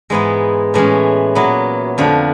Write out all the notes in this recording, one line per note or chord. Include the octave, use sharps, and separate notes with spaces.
G#2 E3 G#3 B3 E4
A2 E3 G#3 C#4
A#2 F#3 B3 E4
F2 D3 F3 A3